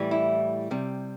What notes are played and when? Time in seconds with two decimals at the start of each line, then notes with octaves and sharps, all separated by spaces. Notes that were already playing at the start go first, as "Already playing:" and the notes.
Already playing: A2 E3 G3
0.11 E4
0.71 C3 G3